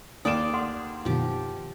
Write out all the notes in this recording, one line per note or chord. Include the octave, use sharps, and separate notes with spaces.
D#2 A3 D5 F5 G5 D#6 E7
A4 F#5 C6
F#2 B2 D#3 F3 G4